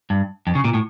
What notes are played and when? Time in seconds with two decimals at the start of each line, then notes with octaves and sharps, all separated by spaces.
0.10 G2
0.47 F2
0.55 C#3
0.65 A#2
0.74 A2